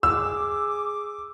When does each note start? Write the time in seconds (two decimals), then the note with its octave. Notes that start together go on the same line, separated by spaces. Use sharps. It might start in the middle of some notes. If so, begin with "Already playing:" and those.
0.03 G#4 D6 E6